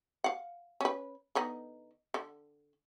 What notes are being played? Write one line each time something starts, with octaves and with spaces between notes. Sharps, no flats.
F5 F#5
C#4 B4
D3 B3 D#4
D3